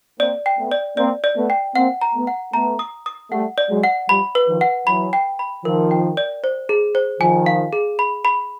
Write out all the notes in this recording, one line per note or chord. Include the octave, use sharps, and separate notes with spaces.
A#3 C4 D5
G5
A3 B3
D5
A#3 C4 D5
D5
A3 B3
G5
A#3 C4 F#5
A#5
A3 B3
F#5
A3 B3 A#5
D#6
D#6
G3 A3 F#5
D5
F#3 G#3
F#5
F3 G3 B5
B4
D#3 F3
F#5
E3 F#3 B5
G5
B5
D#3 F3 A#4
G5
D5
C5
G#4
C5
D#3 F3 G#5
F5
G#4
B5
B5